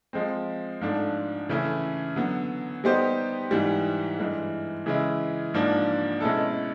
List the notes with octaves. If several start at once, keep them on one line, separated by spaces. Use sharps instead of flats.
F3 G#3 C4
G#2 F3 A3 D4
C#3 E3 A3 C#4 E4
D3 F#3 B3
G3 B3 D#4 G4 C5
G#2 E3 G3
G2 E3 G#3
C#3 E3 G#3 C#4 E4
G#2 F3 A#3 D4
B2 G#3 C#4 E4 A4